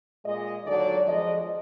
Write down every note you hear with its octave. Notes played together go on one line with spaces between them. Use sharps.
A#2 G#3 D#5
D#2 D3 F#3 D5
F2 F3 G#3 D#5